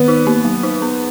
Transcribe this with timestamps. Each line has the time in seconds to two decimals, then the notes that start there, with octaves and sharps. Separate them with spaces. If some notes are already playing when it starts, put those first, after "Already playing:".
Already playing: D#3 B3
0.08 D#4
0.27 A#3
0.45 F#3
0.63 D#4
0.82 B3